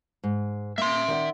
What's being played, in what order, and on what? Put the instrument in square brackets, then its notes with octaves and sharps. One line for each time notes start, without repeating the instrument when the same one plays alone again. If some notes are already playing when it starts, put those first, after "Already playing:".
[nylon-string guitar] G#2
[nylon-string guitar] A#3 [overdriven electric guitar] E5 C6
[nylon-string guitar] D#3 D5 F#5